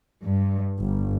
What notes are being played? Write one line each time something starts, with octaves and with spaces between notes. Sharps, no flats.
G2
G1